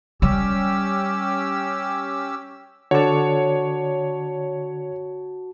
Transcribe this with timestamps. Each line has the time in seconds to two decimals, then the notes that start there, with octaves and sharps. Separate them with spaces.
0.22 G3 C#4 G4 E6
2.91 D3 F#4 C#5 D5 A5